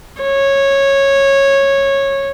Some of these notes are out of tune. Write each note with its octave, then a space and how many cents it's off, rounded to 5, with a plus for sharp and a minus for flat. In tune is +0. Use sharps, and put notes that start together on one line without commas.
C#5 -10